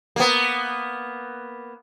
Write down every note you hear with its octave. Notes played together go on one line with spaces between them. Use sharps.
A#3 B3